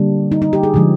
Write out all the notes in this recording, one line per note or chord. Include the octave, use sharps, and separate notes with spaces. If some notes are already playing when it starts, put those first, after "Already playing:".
Already playing: D3 G3 A#3 D4
D#4
D#4
G4
G#4
D3 F3 G#3